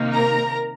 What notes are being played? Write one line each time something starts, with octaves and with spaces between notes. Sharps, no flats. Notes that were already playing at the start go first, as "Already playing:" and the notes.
Already playing: C3 D#3 A#3 D#4
A#4 A#5